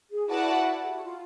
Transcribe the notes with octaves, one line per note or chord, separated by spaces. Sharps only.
G#4
E4 F#4 B4 D5 F#5 A5
G#4
G4
F#4
F4